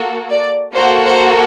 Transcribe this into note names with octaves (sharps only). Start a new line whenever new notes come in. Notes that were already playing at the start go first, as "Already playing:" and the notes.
Already playing: A#3 F#4 A4
D5
A#3 F#4 A4 C5
C5